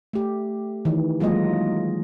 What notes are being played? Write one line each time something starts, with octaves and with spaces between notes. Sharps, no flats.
A3 G4
D#3 E3
F#3 G#3 A#3 F4 D#5